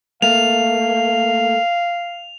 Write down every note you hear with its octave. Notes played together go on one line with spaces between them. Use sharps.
A3 A#3 F5 F7